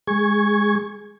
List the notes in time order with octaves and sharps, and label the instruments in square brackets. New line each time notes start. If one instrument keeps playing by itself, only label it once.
[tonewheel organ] G#3 G#4 C#6 G#6